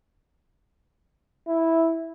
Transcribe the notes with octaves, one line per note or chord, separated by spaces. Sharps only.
E4